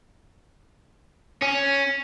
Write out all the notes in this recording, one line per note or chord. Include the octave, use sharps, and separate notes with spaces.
C#4